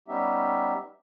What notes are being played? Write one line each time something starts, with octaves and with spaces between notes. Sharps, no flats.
G3 B3 C#4 D#4 G4 E5